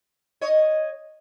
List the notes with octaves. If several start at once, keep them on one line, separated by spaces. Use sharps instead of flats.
C#5 D#5